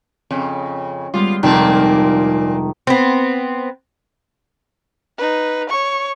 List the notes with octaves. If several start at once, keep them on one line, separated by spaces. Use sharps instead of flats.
F2 C#3
G3 G#3 B3 F4
F1 A#2 D#3 A#3 C4 D4
B3 C4
D#4 B4
C#5 C#6